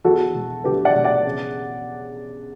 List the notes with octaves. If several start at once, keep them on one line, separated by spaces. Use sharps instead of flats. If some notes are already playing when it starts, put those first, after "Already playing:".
E2 F#4 A4
E1
D3 G4 B4
D5 F#5
E1
D5 F#5
C#3